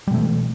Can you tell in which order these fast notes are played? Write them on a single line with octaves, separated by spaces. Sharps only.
G3 B2 A3 E3